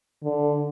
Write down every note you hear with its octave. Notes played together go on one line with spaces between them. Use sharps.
D3